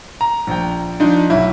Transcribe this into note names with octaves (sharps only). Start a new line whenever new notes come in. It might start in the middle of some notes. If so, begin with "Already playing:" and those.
A#5
A#1 G5
F3 D4 D#4
B1 E4